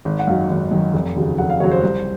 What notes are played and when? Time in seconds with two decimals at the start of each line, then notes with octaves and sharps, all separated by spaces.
0.05 G#1
0.19 F#5
0.27 F#2 D#3 F#3 F5
0.49 G#1
0.71 F#2 D#3 F#3
0.94 F1
1.16 D#2 C#3 F#3
1.38 F1 F#5
1.50 F5
1.60 D#2 C#3 F#3 C#5
1.72 C5
1.83 C2